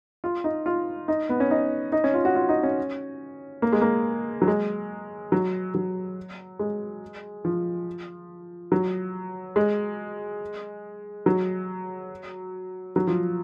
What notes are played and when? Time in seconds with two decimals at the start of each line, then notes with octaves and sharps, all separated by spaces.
0.24 F4
0.44 D#4
0.66 F4
1.08 D#4
1.29 B3
1.40 C#4
1.51 D#4
1.92 D#4
2.04 C#4
2.14 F4
2.25 F#4
2.35 F4
2.49 D#4
2.63 C#4
3.62 A#3
3.73 G#3
3.81 A#3
4.42 F#3
4.47 G#3
5.32 F#3
5.75 F#3
6.59 G#3
7.45 F3
8.72 F#3
9.56 G#3
11.26 F#3
12.96 F#3
13.07 F3